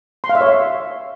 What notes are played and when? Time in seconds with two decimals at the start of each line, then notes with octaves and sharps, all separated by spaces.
0.24 C6
0.29 F5
0.35 E5
0.41 C#5
0.46 E5